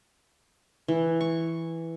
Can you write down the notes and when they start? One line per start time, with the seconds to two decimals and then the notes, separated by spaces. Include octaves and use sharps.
0.88 E3
1.21 C#6